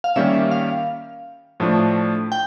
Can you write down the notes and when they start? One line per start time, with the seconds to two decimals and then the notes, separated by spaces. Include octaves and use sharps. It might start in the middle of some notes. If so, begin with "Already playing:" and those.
0.04 F5
0.16 D#3 G3 A#3 C#4 E5
0.51 F5
1.60 A2 F3 A3 D4
2.32 G5